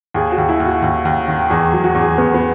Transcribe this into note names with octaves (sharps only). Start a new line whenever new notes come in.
D#2 G#4
F#4
D#2
E4
D#2
F#4
D#2
D#2
D#3
E2 G#4
F#3
F#4
E2
G#4
E2 B3
B3